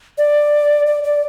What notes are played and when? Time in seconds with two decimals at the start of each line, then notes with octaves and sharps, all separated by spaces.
0.18 D5
0.86 D5
1.04 D5